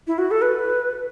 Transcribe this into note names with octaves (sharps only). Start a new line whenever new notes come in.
E4
F#4
A4
B4